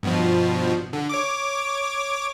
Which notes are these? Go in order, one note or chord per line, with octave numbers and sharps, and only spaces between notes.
G2 B2 F3
D3
C#5 D6